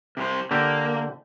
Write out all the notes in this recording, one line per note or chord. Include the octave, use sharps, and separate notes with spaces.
C3 G3 C5
D3 A#3 G4